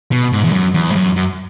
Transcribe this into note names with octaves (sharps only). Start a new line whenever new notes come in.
B2
G#2
E2
F#2
E2
G#2
F#2
F#2